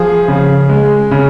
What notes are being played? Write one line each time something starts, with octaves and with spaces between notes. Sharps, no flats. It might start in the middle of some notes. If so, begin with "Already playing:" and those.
Already playing: F3 G#4
C#3
G#3
C#3